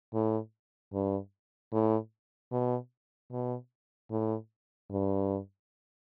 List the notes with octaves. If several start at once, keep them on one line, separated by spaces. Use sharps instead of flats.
A2
G2
A2
B2
B2
A2
G2